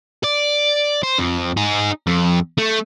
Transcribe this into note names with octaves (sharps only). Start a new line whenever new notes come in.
D5
C5
F2
D#4 G#4
F2
A3